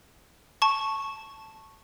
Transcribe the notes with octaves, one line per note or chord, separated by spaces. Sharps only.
A5 C#6